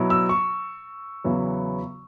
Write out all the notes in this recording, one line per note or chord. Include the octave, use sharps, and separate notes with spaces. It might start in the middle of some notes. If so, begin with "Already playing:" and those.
Already playing: B2 F#3 B3 E4
E6
C#6
E2 C#3 F#3 B3 E4